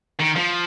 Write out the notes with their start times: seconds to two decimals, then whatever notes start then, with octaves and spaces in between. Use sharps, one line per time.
0.20 D#3
0.37 F3